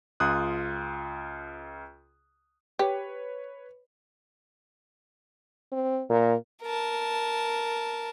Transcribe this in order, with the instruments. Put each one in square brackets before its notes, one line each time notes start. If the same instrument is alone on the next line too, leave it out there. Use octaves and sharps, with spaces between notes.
[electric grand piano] C#2 F4 D#6 F#6
[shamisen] G4 [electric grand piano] B4 C#5
[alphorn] C4
[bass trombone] A#2 [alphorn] A#4
[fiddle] A#4 A5